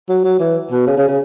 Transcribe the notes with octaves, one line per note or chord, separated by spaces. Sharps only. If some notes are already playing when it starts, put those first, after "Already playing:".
F#3
F#3
E3
B2
C#3
C#3
C#3